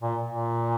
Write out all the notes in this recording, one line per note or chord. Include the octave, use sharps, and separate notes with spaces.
A#2
A#2